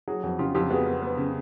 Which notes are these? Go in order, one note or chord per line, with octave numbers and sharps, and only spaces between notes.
F#3 F#4 G#4
F2 F#4
C#3 F4 G4
F2 F4 G4
B3 F#4 G#4
B3
B3
C#3